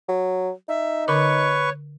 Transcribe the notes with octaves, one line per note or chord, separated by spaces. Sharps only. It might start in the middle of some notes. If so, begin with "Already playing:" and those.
F#3
D#4 E5
D3 A#4 B4 C#5 C#6 D6